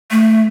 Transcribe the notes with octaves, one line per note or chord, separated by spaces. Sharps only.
A3